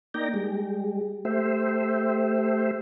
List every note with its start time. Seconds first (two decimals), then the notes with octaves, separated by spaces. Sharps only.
0.14 A#3 D#4 D5 G5 A#5
0.34 G3 G#3
1.25 A3 G4 C5 E5